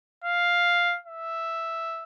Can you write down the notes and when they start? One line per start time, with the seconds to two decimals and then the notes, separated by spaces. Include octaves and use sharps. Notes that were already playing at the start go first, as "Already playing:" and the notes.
0.24 F5
1.06 E5